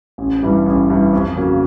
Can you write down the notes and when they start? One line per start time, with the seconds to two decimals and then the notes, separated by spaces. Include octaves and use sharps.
0.18 A1
0.43 G2 E3 G3
0.66 A1
0.90 G2 E3 G3
1.13 F2
1.37 C#3 F#3 A#3